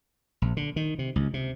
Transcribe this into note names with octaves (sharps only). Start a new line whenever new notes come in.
A#1
D3
D#3
C3
C#2
C3